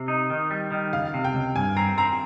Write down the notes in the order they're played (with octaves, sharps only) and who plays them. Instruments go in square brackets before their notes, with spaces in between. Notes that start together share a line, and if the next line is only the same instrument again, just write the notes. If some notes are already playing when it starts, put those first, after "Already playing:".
Already playing: [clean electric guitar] C3
D#4
D#3
G3
D#3
[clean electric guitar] C#2 [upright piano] F5
[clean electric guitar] C3
[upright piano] G5
[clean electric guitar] C#2
[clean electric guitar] G2 [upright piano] G#5
[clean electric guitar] C4 [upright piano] A#5
[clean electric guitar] C4 [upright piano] A#5